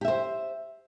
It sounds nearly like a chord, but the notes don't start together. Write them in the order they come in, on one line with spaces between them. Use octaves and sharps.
G4 E5 C5